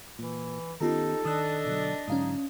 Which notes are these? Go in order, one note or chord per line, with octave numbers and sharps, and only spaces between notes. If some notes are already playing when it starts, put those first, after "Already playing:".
A#2 E3
D#3 B3 C#4 D#4 F4 G4 A4 A#5
D#3 D4 D#5 D#6 E6 F#6
B2 D3 F#3
G#2 D3 F#3 C#4 D#4 F5 D#6